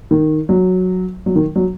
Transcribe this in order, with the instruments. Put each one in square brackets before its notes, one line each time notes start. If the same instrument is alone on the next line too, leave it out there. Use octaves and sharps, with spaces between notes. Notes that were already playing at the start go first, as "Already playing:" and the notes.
[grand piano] D#3
F#3
F#3
D#3
F#3